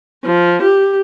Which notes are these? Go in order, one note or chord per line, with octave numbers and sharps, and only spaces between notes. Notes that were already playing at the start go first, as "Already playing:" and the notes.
F3
G4